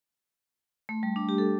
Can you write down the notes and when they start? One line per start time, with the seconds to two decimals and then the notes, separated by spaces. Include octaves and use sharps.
0.89 A3
1.03 G3
1.16 D4
1.29 G4
1.38 A4